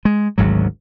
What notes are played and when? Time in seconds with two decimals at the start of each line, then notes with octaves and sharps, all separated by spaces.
0.05 G#3
0.38 G#1 D2 G#2 F#3